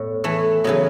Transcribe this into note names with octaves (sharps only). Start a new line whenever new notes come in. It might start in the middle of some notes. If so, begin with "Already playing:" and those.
Already playing: E2 A2
E3 A3
C#3 E3 F#3 B3